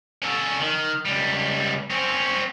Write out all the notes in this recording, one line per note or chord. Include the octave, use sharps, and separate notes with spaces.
C#4 A4
D#3
C#2 G3
C4 C#4